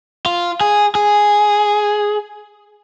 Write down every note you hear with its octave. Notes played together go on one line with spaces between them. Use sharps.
F4
G#4
G#4